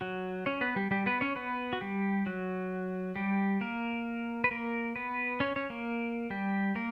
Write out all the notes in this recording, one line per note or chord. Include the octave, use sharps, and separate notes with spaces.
F#3 F#4
C#4 C#5
B3 B4
G3 G4
G3 G4
B3 B4
C#4 C#5
B3 B4
F#4
G3 G4
F#3 F#4
G3 G4
A#3 A#4
B4
A#3 A#4
B3 B4
C#4 C#5
C#4 C#5
A#3 A#4
G3 G4
A#3 A#4